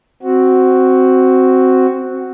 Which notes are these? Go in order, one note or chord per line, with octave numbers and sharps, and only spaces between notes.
C4 F#4